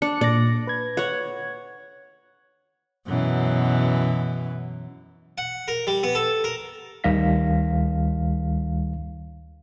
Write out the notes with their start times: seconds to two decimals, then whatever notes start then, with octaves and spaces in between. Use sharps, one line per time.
0.02 D4 C#7
0.21 A#2 D5 A#6
0.67 B4 G#6
0.97 C#5 F#5
3.07 F#2 B2 E3
5.38 F#5
5.68 A#4
5.87 G3
6.03 B3
6.15 A4
6.44 A#4
7.04 D2 D#3 G3 F5 A#6 B6